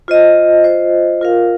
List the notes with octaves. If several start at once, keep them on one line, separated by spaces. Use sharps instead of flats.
F4 C5 D#5
F4 C5 D#5
F4 A#4 F5